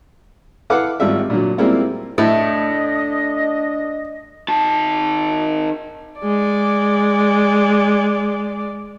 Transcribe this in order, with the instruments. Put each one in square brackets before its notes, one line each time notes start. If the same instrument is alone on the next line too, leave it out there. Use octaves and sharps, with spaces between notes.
[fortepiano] E4 A4 B4 F5 F#5 D6
G#1 G3 F4 E5
A#2 D3 F#3
G3 G#3 A#3 C4 E4 F4
[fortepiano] A2 [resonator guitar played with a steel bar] A3 [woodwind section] D4 D#5
[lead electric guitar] D#3 A5
[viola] G#3 D5